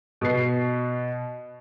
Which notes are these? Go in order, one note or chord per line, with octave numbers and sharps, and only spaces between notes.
B2 B4 C7